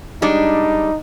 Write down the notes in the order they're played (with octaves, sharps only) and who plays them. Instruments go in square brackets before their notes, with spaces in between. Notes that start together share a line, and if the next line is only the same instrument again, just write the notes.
[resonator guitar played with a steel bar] G3 G#3 D4 [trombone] D#4